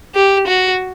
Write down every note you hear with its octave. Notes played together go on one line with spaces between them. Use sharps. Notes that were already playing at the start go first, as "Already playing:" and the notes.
G4
F#4